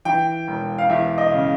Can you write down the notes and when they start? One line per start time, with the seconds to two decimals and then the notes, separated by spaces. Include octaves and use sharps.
0.05 E3 G5
0.48 E1
0.78 F5
0.89 E2 E5
1.18 D#5
1.32 C#3